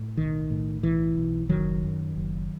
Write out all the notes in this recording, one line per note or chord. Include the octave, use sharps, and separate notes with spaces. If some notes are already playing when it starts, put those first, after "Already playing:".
Already playing: A2
B1 D#3
A2
B1 E3
B1
F#1 D#3 F#3
F#2
F#1